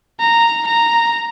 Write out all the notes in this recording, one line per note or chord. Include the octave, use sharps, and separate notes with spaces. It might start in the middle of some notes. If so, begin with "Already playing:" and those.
A#5
A#5